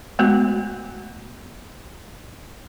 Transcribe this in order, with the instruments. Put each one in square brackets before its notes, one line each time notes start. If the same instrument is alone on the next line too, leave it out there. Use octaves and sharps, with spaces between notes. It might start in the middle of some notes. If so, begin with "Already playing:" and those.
[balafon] G#3 A3 B3 F#4